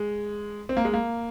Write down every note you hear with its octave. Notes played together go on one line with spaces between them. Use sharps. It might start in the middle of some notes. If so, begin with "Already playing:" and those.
Already playing: G#3
C4
A#3
G#3
A#3